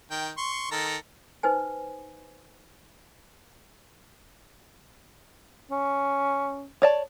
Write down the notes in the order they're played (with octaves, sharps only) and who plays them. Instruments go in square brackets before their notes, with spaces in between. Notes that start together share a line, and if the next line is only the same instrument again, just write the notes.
[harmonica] D#3 G5
C6 C#6
D#3 A4 A#5
[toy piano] D#4 B4 C5 G#5
[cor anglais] C#4
[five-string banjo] C#5 D5 A5